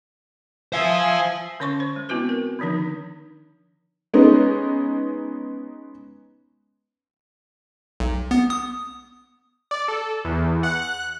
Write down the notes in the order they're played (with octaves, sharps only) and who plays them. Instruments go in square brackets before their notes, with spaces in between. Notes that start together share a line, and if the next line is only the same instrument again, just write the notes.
[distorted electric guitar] C5 F5 [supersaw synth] E5 G#5 D#6
[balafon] D3 C#4 C#5 C6 C#6
C5
G#3
B3 C4 E4 F#4 B4
A#4
D3 D#3 F3 D4 D#4
[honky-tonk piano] G#3 B3 C#4 D#4
[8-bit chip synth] B1
B3
D#6
[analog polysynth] D5
A4
E2
F#5
F#6